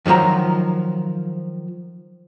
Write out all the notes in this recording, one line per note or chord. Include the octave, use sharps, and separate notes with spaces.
E2 D#3 F3 F#3 A#5